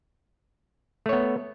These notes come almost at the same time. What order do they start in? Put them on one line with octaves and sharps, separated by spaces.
A3 C#5 B3